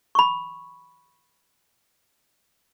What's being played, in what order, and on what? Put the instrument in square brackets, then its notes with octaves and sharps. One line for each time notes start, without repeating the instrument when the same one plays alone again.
[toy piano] B5 C#6